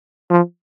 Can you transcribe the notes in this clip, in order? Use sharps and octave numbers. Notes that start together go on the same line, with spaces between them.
F3